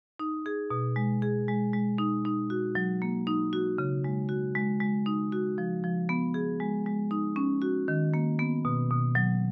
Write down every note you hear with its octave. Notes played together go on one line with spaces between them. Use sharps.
D#4
G#4
B2
G#3
G#4
G#3
G#3
D#4
D#4
F#4
F#3
A#3
D#4
F#4
C#3
G#3
F#4
G#3
G#3
D#4
F#4
F3
F3
B3
G#4
G#3
G#3
D#4
C#4
F#4
D#3
A#3
B3
B2
B2
F#3